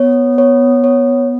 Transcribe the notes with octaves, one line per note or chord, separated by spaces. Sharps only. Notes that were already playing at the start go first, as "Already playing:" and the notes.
Already playing: B3 C#5
C#5
C#5